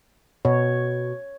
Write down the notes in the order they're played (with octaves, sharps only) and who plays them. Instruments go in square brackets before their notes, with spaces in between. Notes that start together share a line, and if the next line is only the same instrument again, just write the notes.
[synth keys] B2 [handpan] C#5